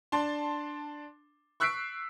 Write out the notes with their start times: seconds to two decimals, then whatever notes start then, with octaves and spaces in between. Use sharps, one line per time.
0.12 D4 A5 C6
1.60 C#6 E6 F#6 B6 C7 D7